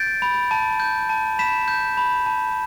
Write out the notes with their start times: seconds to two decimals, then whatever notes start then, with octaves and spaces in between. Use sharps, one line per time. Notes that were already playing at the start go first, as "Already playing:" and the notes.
Already playing: G6 A6 D7
0.22 B5
0.51 A5
0.80 G6
1.09 A5
1.39 B5 B6 E7
1.68 G6
1.97 B5
2.26 A5